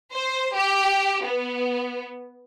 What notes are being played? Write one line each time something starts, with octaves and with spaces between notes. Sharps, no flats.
C5
G4
B3